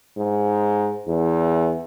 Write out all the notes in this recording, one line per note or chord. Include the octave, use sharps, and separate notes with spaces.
G#2
E2